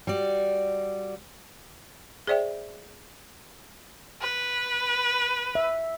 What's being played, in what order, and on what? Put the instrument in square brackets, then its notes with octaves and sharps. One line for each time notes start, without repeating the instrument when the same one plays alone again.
[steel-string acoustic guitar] G3 F#4 D5
[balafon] G#4 C5 D5 E5 G5
[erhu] B4
[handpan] E5